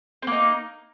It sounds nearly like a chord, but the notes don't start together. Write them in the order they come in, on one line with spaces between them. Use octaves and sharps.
C4 A#3 D#4